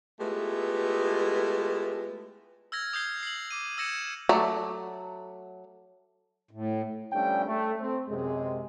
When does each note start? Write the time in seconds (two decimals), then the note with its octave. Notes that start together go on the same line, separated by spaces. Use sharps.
0.20 G#3 A3 B3 E4 F4 G4
2.72 E6 F6 G#6 A#6
2.93 D#6 E6 G6 G#6 C7 G7
3.23 C7 F#7
3.51 D6 D#7
3.78 E6 G#6 A#6 C#7 E7
4.29 F#3 A3 D5
6.51 A2
7.12 F3 G3 A3 C#4 D4 G5
7.45 A3
7.80 C4
8.09 F#2 C3 G#3